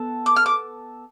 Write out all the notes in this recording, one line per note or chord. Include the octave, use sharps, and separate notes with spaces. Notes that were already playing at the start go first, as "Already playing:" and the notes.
Already playing: B3 A4
D6
F6
D6